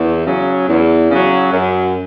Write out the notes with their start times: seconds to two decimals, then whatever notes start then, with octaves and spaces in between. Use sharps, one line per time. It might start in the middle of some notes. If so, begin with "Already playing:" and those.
Already playing: E2
0.26 C#3 F#3
0.68 E2
1.10 C#3 F#3
1.52 F#2